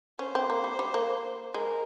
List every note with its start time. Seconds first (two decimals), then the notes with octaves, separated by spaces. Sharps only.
0.19 C#4 C5
0.35 C4
0.50 A#3
0.64 G3
0.79 G3
0.94 A#3
1.54 G#3 A#4